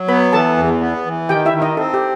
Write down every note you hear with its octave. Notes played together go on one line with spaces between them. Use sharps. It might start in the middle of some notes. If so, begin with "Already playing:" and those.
Already playing: F#3
B3 B4 B5
E3 A4 A5
E2
B3
E3
D#3 G4 G5
E4 E5
D#3
D#4 D#5
C4 A4
G4